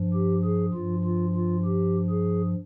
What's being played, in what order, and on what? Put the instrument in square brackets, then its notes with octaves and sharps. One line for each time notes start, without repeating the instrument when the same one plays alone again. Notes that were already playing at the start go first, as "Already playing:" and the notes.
Already playing: [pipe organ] G2 F3
G4
G#4
G2 F3 F4
F4
F4
G4
G#4